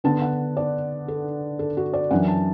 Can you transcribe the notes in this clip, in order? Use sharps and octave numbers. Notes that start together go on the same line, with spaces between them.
D3 B3 D4 A5
F#5
D5
A4
A4
F#4
D5
F#2 E3 D4 F#5
A5